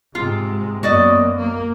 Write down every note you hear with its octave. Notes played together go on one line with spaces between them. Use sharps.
G#2 C3 G#3 F4
F#2 A#3 B3 F#4 D5 D#5
A#3